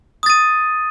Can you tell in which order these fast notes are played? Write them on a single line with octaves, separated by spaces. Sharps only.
D#6 A6 D#7